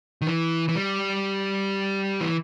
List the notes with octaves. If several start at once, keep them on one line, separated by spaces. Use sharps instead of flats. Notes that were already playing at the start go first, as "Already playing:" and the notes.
D#3
E3
E3
G3
E3